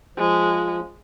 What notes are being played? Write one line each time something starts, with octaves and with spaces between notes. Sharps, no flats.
F3 G#3